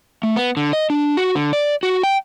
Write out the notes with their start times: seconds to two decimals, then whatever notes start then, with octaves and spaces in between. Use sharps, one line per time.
0.23 A3
0.36 B3
0.57 D3
0.73 D#5
0.90 D4
1.17 F#4
1.35 D3
1.53 D5
1.83 F#4
2.03 G5